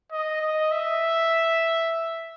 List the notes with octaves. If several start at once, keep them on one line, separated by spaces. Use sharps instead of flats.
D#5
D#5
E5